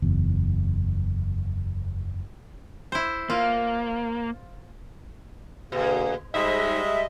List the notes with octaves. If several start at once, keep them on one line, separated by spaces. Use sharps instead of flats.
F#1 E2
E4 C5
A#3 F4
B2 D3 A#3 G#4
G#2 G3 G#3 D#5 E5